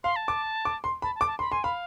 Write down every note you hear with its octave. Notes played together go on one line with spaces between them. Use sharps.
F5 C6
A5
D6
D6
C6
A5 B5
A5
D6
A5
B5 C6
G#5 C6
F5 B5